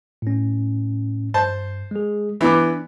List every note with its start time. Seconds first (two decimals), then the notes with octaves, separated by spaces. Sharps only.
0.22 A2 C#4
1.34 G2 C5 A5
1.91 G#3 G#4
2.41 E3 B3 D4 D6